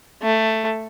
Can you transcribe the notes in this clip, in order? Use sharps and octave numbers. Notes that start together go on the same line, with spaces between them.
A3